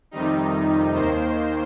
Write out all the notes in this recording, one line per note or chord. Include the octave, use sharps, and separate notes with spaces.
F2 C3 D#3 G3 D#4
D#2 D#3 A#3 C5